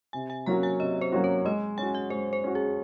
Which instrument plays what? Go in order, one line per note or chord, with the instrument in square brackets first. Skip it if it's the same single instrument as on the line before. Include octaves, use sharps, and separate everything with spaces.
[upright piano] C3 [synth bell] G#5
[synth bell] G#5
[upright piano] F#3 A#3 C#4 F#4 [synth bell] A#5
[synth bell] G#5
[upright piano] C3 [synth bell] D#5
[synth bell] C5
[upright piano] F#3 A#3 C#4 F#4
[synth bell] C#5
[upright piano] G#3 [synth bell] D#5
[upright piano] C#4 F#4 [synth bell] G#5
[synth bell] F#5
[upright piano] G#3 [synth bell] C5
[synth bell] C5
[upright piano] C#4 F#4
[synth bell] G#4